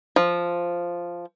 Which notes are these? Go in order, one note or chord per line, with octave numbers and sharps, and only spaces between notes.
F3